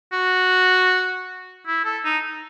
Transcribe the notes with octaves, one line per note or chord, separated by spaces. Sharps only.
F#4
E4
A4
D#4